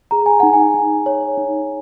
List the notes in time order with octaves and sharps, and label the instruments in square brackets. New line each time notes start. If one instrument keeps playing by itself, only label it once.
[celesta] G#4 A#5
G#5
D#4 F#5
G#5
D#4
C#5
D#4